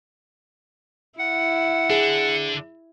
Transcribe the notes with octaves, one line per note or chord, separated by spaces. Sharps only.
E4 F#5
D3 D4 G#4